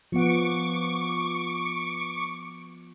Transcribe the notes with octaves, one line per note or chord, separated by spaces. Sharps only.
F3 B3 F#5 C#6 D6